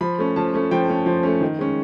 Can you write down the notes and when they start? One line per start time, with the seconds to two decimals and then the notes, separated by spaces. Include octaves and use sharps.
0.01 F3 B5
0.19 A3 C#4
0.36 F3 A5
0.54 A3 C#4
0.71 F3 G5
0.88 A3 C#4
1.06 F3
1.23 A3 C#4
1.41 D#3
1.59 G#3 C#4